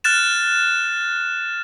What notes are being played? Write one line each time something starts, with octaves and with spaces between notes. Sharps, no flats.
F6 F#6 A6 E7